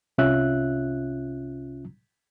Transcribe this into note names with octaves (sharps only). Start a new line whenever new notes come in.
C2 C3 C#4 F4 E5 F#6